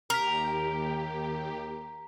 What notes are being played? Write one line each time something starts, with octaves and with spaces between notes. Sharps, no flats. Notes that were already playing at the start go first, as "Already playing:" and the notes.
D#2 G4 A#4 A#5 B6